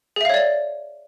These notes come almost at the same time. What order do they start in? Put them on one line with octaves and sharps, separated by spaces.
G#4 E5 F5 C#5 D5